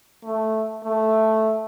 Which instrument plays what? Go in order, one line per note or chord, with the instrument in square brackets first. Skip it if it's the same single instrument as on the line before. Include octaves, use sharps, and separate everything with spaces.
[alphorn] A3
A3